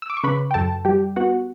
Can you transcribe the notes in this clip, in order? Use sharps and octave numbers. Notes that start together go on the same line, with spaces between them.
E6
D6
C#6
C#3 B4 B5
G5
F#2 A4 A5
G3 G4 G5
B3 F#4 F#5